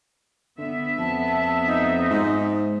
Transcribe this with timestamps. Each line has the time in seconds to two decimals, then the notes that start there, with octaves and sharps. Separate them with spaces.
0.58 D3 B3 E5
0.98 F2 A5
1.66 D#4
2.11 G#2